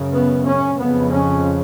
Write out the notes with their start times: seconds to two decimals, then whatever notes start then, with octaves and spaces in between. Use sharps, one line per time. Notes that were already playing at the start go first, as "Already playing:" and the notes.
Already playing: F#2 C#3
0.13 B3
0.45 C#4
0.79 F2 C#3 B3
1.12 C#4